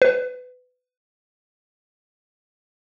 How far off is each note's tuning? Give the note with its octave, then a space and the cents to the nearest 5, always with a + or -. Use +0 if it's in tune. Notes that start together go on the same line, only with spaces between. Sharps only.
B4 +25